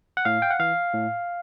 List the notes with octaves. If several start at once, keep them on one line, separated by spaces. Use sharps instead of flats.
F#5
A2 F5
G5
F#5
E3 F5
A2